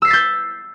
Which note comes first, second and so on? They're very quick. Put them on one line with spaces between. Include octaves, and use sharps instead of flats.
E6 C7 B6 A6 G6